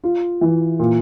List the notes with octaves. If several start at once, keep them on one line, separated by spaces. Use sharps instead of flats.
F4
E3
A#2